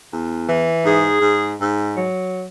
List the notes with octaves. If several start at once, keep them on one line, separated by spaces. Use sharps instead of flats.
E2
E3
G#2 G#4
G#2
G#2
F#3